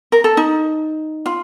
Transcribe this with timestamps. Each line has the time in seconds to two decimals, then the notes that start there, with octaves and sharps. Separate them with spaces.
0.12 A#4
0.24 A4
0.37 D#4
1.26 F4